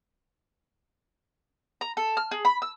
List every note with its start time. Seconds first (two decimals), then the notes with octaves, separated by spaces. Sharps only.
1.81 A#5
1.97 A4
2.17 F6
2.31 G#4
2.45 B5
2.62 E6